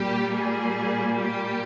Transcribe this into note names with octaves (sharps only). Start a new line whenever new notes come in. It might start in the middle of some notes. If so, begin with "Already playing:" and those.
Already playing: A#2 G3 A#3 G4
G#4
G4